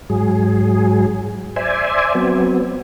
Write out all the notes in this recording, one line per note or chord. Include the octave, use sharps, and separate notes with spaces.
G#2 F#3 G#4
C5 D5 E5 G#5
F#3 B3 C4